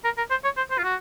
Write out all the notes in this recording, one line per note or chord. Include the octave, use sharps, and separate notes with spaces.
A#4
A#4
C5
C#5
C5
C5
F4
F#4